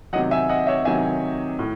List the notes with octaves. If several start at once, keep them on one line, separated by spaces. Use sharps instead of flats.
C3 D#3 F#3 D#5 F#5
E5 G#5
D#5 F#5
C#5 E5
C3 D#3 F#3 E5 G#5
A2